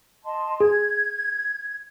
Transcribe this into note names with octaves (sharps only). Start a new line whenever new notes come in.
D#5 A5 C6
G#4 G#6